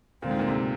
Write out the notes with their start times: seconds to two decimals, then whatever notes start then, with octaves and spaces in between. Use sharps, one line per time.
0.22 D2 A#2 D3 G#3 C4 F4
0.31 G#2
0.39 A#2
0.48 G#2 C3